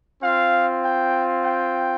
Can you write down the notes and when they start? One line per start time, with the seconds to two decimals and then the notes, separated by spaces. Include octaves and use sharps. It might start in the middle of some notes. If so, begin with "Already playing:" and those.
0.22 C4 F4 F5
0.84 G5
1.44 G5